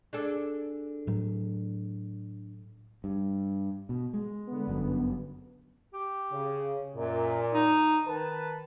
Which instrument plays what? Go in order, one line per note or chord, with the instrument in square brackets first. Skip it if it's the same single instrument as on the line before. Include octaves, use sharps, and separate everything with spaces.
[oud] D4 G#4 A4
[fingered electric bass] A2 F#3
G2
B2
G#3
[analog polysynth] D3 B3
[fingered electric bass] G1 F#2
[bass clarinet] G4
[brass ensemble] C#3
[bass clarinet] F#2 [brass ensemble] A#2
[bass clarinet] D#4
[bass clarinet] D#3 [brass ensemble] B4 A5